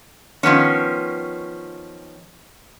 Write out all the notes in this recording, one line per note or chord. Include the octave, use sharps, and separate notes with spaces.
D#3 F3 B3 C#4